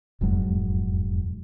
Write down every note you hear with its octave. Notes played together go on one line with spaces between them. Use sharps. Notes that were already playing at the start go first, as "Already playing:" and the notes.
E1 F2 G#2 F#3